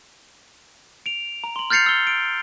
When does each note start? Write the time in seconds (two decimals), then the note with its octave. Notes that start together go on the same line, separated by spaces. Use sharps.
1.06 D7 F7
1.44 A#5
1.56 C6 F#7
1.70 F6 G6 A6 C7 C#7 F7
1.86 E6 G7
2.07 D7